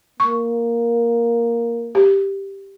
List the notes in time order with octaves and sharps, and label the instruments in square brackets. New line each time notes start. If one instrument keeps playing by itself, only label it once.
[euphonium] A#3 [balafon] C#6
[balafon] G4